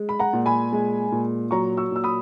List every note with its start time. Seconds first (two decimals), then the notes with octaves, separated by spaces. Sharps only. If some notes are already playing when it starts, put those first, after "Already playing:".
Already playing: G#3
0.09 B5
0.19 F#5 A#5
0.33 A#2
0.46 G#5 B5
0.72 G#3
1.12 A#2
1.51 F#3 A#5 C#6
1.77 C#6 E6
1.91 A#2 E6
2.04 B5 D#6